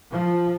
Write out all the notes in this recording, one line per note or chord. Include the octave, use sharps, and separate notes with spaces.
F3